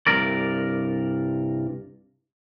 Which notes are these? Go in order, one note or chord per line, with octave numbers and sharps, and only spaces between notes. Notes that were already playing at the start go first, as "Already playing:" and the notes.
C2 G2 A#4 D5